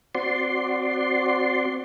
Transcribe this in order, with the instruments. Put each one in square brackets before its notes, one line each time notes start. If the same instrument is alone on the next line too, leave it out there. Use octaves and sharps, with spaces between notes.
[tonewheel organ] C4 F#4 D5 C6